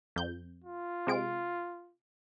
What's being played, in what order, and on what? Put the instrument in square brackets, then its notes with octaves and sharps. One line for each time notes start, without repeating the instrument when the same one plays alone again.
[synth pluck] F2 G6
[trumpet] F4
[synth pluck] C3 G#3 D7